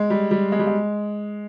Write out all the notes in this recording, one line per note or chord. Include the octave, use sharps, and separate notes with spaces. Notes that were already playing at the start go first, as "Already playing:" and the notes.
Already playing: G#3
G3
G3
G#3
G3
G#3